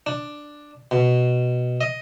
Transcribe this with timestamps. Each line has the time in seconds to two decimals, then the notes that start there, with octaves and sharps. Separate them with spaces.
0.06 D4
0.91 B2
1.81 D#5